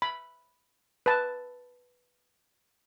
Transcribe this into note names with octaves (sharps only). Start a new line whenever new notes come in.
B5
B4 A5